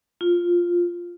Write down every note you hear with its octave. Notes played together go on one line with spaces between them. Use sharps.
F4